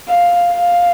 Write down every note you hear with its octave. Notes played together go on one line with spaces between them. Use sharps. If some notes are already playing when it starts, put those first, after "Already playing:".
F5
F5